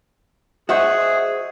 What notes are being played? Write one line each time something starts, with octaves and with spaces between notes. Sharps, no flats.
F#4 G#4 C5 D#5 E5 F#5 C#6